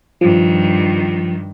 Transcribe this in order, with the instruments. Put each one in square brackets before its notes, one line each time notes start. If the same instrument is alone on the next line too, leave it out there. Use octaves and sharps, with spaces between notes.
[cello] G2 D#3 [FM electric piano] F3